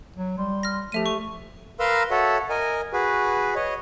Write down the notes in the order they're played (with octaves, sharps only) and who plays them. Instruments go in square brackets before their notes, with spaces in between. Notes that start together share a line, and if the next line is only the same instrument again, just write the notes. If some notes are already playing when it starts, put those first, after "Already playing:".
[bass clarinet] F#3
[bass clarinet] G3 [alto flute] C6
[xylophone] F6 A#6
[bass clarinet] F3 [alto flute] A3 [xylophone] G4 E5 D#7
[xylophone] C#6
[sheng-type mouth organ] A#4 B4 F5 A#5 C6 E6
F#4 A4 C#5 E5 F#5
A#4 D#5 G#5
F#4 G#4 B4
C#5 D#5